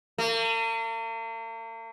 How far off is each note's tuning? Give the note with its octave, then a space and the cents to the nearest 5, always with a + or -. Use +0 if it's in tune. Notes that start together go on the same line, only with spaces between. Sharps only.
A#3 -45